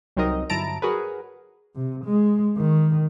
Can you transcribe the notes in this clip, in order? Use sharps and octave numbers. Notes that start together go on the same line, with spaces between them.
C2 F#3 C4 D#4 A#4 D#5
G1 F#3 E4 A5 A#5 D7
F#3 F#4 G#4 A#4 B4
C3
G#3
D#3